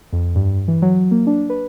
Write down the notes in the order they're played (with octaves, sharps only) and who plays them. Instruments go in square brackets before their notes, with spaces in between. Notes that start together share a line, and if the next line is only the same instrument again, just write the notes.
[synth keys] F2
G2
E3
F#3
A#3
D4
B4